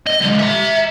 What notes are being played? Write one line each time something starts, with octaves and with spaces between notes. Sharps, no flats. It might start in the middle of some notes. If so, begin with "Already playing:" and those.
D#5
D3 G#3
E5 A#5